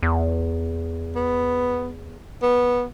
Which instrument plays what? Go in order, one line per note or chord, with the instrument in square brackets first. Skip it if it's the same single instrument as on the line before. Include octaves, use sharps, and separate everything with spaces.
[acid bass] E2
[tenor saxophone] B3
B3